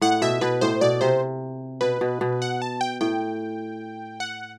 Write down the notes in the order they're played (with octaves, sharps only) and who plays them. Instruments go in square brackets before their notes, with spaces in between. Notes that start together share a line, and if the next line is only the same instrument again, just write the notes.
[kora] A2 [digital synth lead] F#5
[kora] B2 [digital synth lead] E5
[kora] B2 [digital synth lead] B4
[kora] A2 [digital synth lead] C5
[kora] B2 [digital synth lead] D5
[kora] C3 [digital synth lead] C5
[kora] B2 [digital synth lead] B4
[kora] B2
B2
[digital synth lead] F#5
A5
G5
[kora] A2 [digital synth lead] G5
[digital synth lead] F#5